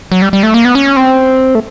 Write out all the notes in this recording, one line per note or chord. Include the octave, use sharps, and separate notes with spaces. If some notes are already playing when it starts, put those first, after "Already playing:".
F#3
G3
G3
A3
A#3
B3
C#4
C4
A3